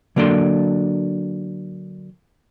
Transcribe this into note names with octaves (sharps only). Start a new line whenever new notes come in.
D3 F#3 A#3 D4 A4 C6